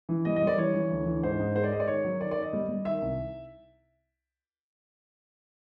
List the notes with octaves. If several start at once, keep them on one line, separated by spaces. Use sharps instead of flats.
E3
G3 D#5
D#5
G3 D5
E3 C#5
E3
D2
E3
G#2 C5
G#2
G#3 C5
D5
G#3 D#5
D5
D#3 C#5
F#3
D#3 D5
D5
D#3
D#5
G3
G3
D#3 E5
C2